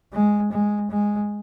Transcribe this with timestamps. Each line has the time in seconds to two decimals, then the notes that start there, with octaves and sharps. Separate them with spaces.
0.13 G#3
0.52 G#3
0.91 G#3